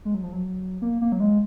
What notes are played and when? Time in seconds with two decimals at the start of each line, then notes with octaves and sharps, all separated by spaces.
0.05 G#3
0.14 F#3
0.23 F3
0.33 F#3
0.82 A#3
1.01 A#3
1.12 F#3
1.20 G#3